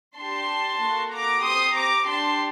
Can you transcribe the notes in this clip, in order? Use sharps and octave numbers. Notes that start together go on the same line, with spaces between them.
D4 G4 A5 C6
A#3 F#4 A4
A#5 D6
C4 G4 C6 D#6
A#5 D6
D4 G4 A5 C6